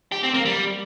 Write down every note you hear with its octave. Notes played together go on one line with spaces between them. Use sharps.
G4
C4
A#3
G3